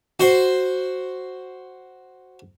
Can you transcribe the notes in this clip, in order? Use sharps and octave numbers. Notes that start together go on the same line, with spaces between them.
F#4 C5 C6